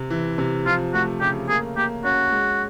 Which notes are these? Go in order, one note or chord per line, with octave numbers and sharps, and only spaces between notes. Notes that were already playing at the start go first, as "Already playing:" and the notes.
Already playing: C3
E3
C3
F3 F4
A3 F#4
C#3 G4
A#3 G#4
A#3 G4
C#4 F#4
G#3